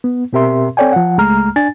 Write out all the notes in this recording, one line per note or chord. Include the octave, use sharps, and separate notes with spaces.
B3
B2 C4 G4 A#4 E5 C6
C4 A4 C#5 D5 G5 G#5
F3 F#5
C#2 G#3 A3 A#5 F6
D4 G#5 A6